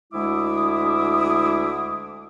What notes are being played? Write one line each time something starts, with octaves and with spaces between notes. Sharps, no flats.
D2 G#3 E4 E5 D6 D#6